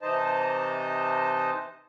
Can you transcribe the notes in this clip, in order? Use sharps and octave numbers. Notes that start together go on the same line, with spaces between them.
C3 E3 D#4 C5 D#5 A5